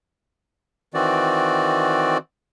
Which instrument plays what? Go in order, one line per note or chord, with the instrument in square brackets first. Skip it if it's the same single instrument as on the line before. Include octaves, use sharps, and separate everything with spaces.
[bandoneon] D#3 E3 C4 F#4 D5